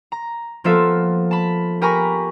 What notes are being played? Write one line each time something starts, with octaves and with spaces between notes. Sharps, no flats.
A#5
F3 A#3 B3 F4 A4 E5
A5 B5
G4 A#4 G#5 A#5 B5 C#6